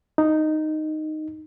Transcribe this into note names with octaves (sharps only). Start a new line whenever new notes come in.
D#4